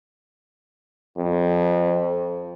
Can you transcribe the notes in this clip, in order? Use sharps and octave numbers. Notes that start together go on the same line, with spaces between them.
F2